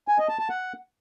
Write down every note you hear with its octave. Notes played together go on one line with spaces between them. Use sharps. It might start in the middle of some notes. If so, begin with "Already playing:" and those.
G#5
D#5
A5
A5
F#5